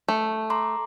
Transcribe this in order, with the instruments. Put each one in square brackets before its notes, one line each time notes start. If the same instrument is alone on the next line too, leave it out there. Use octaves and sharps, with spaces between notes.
[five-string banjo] A3
[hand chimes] A#5 C6 D6